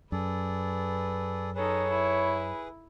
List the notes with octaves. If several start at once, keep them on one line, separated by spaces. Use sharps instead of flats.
F#2 G#4 A4 B4 D5
D#4 G#4 A4 B4 C#5
E4